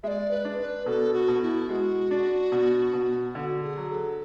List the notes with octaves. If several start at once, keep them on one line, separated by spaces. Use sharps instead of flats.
G#3 D5 E5
B4
D4
B4
B2 A4
F#4
B2
E4
G#3 F#4
D4
B2
B2
D3 F#4
G#4
F#3
A4